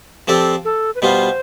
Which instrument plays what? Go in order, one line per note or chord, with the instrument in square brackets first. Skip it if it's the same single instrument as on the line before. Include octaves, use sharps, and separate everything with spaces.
[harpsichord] F3 C4 G4 D5 [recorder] A4
[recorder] A4
B4
[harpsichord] B2 G3 B3 F4 [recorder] C5